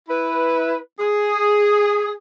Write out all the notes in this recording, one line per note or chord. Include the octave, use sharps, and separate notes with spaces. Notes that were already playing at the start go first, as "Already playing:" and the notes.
E4 B4
G#4